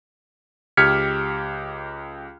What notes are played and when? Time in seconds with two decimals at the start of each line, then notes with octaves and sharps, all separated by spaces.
0.77 C#2 G4 F6 G#6 B6 C#7